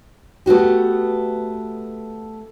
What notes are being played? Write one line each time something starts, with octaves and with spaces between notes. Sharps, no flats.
A3 B3 F#4 G4